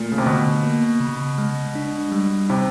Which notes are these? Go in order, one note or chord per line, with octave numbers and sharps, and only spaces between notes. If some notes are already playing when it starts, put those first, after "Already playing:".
Already playing: A#2 A3
C#3
C3
B2 D3
A#3
C#3
G#3
D4
G3
C3 D#4